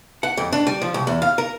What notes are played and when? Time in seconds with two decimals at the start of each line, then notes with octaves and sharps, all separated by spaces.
0.23 F#5
0.37 F2
0.52 D4
0.67 G3
0.82 F3
0.94 C2
1.07 E2
1.22 F5
1.38 A#4